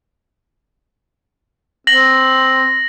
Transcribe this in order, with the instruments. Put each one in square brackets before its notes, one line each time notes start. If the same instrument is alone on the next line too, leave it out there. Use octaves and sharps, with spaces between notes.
[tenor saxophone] C4 [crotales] A#6 F#7